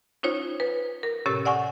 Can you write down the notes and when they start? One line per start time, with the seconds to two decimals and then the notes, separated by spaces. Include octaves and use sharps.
0.23 C#4 D#4 F4 C5 C#5
0.60 B4
1.03 A#4
1.26 A2 C3 C#4 G4 C#5 A6
1.45 D5 F#5 G#5 C#6